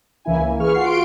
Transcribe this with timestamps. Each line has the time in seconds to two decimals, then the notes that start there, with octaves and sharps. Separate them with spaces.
0.25 C#2 E3 A#3 E4 G#5
0.46 A#3
0.60 G#4 B4 C#6 F6
0.74 F4 F#5 C7
0.86 F4 F#4 C6 D7